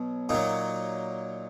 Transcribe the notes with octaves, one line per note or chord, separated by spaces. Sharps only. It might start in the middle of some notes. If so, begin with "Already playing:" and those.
Already playing: B2 F#3
A#2 F#3 D#4